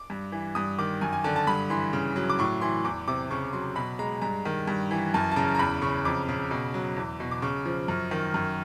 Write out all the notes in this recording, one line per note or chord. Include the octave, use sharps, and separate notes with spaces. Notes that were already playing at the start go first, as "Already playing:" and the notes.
Already playing: D6
G2
E3
G2 D#6
D#3 D6
F#2 G#5
G#5
D3 A5
A5
G2 B5
E3 C6
C#3
F#3
D6
A2 C#6
E3 C6
E2 D6
C3 D6
C#3 C#6
F#3 C6
B2 B5
G#3 A#5
G2 A#5
D#3
G2
E3
F#2 A5
A5
C#3 A#5
A#5
E2 B5
C#3 C#6
F2 D6
C#3
B2
F#3
E2
B2
D6
C#3 C#6
F3
F#2
D#3
F#2